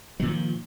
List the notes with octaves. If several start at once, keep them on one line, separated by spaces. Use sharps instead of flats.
A#2 D#3 F3 F#3